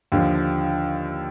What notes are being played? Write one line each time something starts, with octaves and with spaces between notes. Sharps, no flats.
D#2 D3 F3